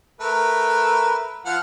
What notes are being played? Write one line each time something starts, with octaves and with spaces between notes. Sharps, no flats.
A3 A#4 B4
F3 F#5 F6